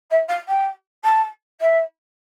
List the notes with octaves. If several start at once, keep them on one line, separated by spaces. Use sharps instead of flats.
E5
F5
G5
A5
E5